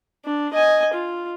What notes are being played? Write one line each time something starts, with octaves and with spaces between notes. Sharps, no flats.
D4
D#5 G#5
F4